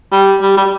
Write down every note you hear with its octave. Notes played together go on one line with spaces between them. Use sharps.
G3
G3
G3